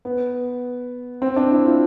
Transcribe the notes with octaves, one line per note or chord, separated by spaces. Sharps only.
B3
C4
D4
E4
F4